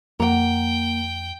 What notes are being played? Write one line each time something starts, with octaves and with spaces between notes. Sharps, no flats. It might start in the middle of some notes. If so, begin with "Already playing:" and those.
F2 A#3 F#5 G5 A#5